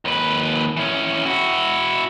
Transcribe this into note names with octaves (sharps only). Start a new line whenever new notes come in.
D#2 B4
E3 C#4
E4 F#4